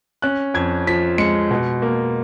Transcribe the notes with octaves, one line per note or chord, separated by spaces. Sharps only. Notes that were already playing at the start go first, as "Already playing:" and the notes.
C#4 F#6
F2 G#6
F3 B6
G#3 C#7
B2
A#3